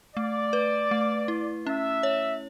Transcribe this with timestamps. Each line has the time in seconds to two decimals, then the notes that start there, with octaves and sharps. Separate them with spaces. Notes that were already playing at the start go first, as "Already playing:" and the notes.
0.15 A3 D5
0.53 B4
0.91 A3
1.28 E4
1.66 C#4 E5
2.03 C#5